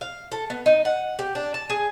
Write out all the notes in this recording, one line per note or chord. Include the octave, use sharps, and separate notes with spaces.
F5
A4
B3
D#4
F#5
G4
D4
A5
G#4